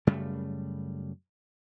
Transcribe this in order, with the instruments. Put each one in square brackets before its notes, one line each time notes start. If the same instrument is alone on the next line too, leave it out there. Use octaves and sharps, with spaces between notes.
[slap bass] F#2 C#3 G3 A3